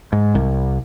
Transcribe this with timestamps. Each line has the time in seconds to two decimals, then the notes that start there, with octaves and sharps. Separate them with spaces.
0.13 G#2
0.35 C2